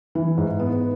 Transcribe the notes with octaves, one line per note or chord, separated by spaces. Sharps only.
E3
G#2
B3